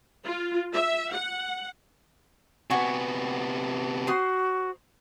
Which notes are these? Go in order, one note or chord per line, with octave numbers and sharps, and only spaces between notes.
F4
E5
F#5
C3 B3 F#4 G#5 C#6
F#4 C5 C6 D#6